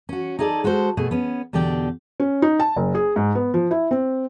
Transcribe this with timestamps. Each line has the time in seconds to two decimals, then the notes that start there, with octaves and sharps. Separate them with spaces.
0.09 C#4 F#4
0.39 D#4 E4 G#4 A4 D5
0.64 G#3 F#4 A4 C5
0.97 B2 A3 G#4
1.11 B3 C#4
1.53 E2 B2 D3 G4 D5 G5
2.20 C#4
2.42 D#4
2.60 A5
2.76 F#1
2.95 G#4
3.16 G#2
3.35 B3
3.54 F3
3.71 E4
3.91 C4